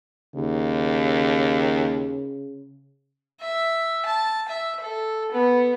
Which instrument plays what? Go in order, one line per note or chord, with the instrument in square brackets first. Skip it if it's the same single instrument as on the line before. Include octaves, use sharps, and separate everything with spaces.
[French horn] D#2 [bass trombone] C#3
[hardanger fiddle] E5
A5
E5
A4
B3